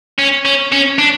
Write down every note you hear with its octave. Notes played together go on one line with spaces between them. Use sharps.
C#4
C#4
C#4
D4